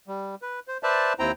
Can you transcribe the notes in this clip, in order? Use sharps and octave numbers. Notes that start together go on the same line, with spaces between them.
G3
B4
C5
B4 C5 D5 E5 A5
D#2 C4 E4 C5 G5 A#5